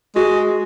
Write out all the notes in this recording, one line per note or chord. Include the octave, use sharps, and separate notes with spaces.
G#3 F#4